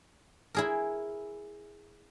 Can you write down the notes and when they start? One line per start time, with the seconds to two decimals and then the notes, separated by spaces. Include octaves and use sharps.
0.55 E4 G#4 A#4